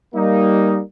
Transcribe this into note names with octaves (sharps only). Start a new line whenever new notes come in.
G3 A#3 D#4